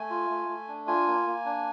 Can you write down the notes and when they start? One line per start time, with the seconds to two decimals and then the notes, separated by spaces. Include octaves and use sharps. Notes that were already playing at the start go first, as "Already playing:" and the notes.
Already playing: A3 G#5
0.10 F4
0.30 A3
0.49 A3
0.68 D4
0.87 F4 G#5
1.07 A#3
1.27 A#3
1.45 D4